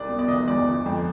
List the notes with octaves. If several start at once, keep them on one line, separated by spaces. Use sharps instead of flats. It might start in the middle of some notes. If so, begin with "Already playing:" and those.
Already playing: C2 D5
B2
D5
F1 D#5
E2 D5
G1
F2